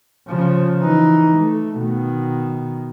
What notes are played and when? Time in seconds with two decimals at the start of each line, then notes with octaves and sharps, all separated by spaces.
0.28 C#3 F3
0.79 E3 D#4
1.38 A3
1.78 B2 D#3